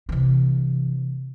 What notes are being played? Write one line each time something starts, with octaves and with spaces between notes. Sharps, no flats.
C3 E3